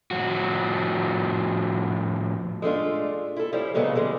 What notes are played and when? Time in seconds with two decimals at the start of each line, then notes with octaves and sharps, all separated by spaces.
0.11 A2 F3 F#4
2.62 G#3 A3 D4 F4
3.36 E4 A4
3.53 F3 G3 C#4 E4
3.74 A#2 C#3 F#3 G#3 A3 B3
3.95 E3 G3 G#3